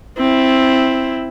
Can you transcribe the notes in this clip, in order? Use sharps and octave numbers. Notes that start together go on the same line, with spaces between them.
C4 E4